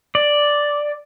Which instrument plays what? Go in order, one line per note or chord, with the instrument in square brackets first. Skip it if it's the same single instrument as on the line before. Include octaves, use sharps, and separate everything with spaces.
[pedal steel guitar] D5